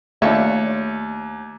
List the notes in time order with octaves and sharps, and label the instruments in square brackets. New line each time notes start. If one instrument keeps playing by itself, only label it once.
[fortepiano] D#2 [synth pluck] A3 C#5 C#7 [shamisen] D4 F4 E5